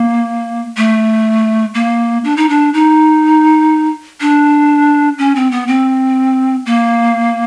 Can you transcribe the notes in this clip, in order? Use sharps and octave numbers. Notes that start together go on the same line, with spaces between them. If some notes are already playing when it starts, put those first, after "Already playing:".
Already playing: A#3
A3
A#3
D4
D#4
D4
D#4
D4
C#4
C4
B3
C4
A#3